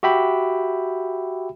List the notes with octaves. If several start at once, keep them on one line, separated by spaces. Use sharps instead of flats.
F#4 G4 E5 G5 B5